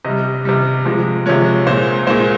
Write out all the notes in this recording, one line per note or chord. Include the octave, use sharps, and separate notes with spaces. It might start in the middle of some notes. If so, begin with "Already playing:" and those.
C3 G3 D#5
C3 G3
C3 F3 G#3
C3 F3 G#3 C#5
A#2 G#3 C5
A#2 G#3 C5